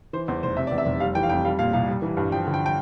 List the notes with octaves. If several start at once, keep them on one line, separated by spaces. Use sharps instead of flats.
E3 C5
E2 C5
F1 C5
C3 E5
E2 D5
E5
F1
G3 F5
E3 G5
F5
F2 G5
G3 F5
A#2 F5
C2 F5
G3
E3
G2
F3 G5
D3
G5
G5